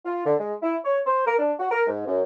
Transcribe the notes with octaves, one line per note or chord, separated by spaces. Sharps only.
F4
D3
G#3
E4
C#5
C5
A#4
D4
F#4
A#4
G#2
F#2